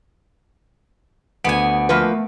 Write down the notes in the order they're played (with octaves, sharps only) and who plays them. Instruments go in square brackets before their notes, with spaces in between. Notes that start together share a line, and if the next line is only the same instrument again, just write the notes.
[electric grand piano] D2 D7 [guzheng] B3 G#5
[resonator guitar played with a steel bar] F3 A#3 B4 [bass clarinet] A3